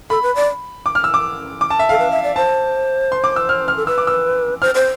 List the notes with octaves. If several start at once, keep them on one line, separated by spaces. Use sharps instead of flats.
A4 B5
B4
D5
D6
F6
E6
D6
D6
A5
E5
A4 F5
B4
E5
D5
C5 A5
C6
D6
E6
F6
F6
A4
B4 E6
D6
E6
C5 F6
C5